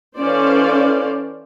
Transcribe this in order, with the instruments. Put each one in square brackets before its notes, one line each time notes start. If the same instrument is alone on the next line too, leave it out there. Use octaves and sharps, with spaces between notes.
[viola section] E3 C#4 A4 C5 D5 F5